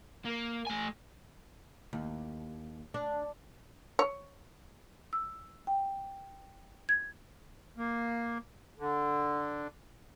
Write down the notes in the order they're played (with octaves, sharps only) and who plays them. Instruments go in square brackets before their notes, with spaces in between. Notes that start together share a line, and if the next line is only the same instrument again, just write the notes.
[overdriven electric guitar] A#3
A3 G#5
[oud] D#2
D4
[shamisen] C#5
[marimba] E6
G5
G#6
[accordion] A#3
D3